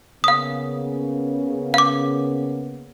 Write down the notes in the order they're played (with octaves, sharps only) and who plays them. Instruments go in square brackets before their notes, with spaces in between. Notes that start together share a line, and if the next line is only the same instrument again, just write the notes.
[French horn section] C#3 A#3 B3 [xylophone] F5 D#6
[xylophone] F5 D6